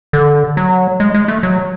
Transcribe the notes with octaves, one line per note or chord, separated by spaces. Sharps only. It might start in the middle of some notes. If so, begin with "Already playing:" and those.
D3
F#3
G#3
G#3
A3
F#3